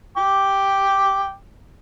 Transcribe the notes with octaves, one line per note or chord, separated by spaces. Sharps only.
G5 D6